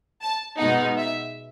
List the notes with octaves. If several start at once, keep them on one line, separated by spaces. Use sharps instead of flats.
A5
B2 G#3 B3 D#4 F#5
E5